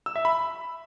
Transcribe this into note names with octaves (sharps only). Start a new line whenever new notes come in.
E6
E5
B5